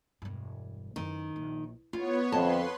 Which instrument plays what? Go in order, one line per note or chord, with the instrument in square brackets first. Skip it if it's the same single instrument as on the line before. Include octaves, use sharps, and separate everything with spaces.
[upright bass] E1 G2
[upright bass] F#2 C4 [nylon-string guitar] D#3
[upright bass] A#1
[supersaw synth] B3 C#5 [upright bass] D#4 [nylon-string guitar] F4
[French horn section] F2 [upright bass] D3 D#3 [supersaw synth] B4 C6 [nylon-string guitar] D#5 F#5 A5